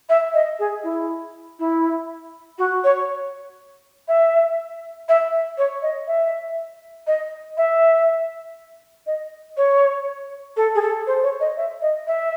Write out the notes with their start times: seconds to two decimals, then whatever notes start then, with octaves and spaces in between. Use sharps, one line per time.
0.09 E5
0.34 D#5
0.59 G#4
0.84 E4
1.59 E4
2.59 F#4
2.84 C#5
4.08 E5
5.09 E5
5.58 C#5
5.82 D#5
6.07 E5
7.07 D#5
7.57 E5
9.07 D#5
9.57 C#5
10.57 A4
10.75 G#4
10.82 A4
11.07 C5
11.23 C#5
11.40 D#5
11.57 E5
11.82 D#5
12.07 E5